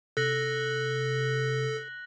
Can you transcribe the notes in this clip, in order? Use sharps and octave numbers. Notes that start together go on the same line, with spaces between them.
C3 A4 F#6 A#6 F#7